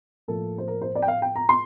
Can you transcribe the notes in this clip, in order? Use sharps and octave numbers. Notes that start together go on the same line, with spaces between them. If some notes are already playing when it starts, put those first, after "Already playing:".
A2 F3 A#3 A4
C5
A#4
C5
D5
G5
F5
G5
A#5
C6